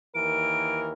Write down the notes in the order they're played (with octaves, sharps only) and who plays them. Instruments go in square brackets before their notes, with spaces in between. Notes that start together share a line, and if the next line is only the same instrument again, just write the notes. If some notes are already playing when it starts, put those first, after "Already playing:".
[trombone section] D#2 E3 A#4 [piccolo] D7